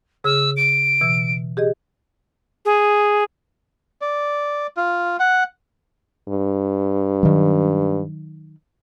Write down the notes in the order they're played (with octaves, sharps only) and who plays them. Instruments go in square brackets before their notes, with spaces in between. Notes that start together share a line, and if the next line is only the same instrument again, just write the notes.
[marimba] C#3 G#4 F6 [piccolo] E6
[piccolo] D7
[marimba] B2 E3 E6
G4 G#4 D#5
[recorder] G#4
[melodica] D5
F4
F#5
[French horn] G2
[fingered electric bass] D#3 F#3